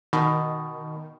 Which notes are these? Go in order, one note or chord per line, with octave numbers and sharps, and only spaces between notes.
B2 D#3